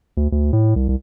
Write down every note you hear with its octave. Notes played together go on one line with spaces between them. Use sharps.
D2
D2
A2
C2
C2